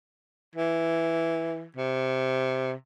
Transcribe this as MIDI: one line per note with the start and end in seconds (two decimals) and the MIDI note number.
0.55 1.66 52
1.76 2.73 48